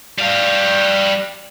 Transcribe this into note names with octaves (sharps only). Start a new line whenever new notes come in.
G3 F5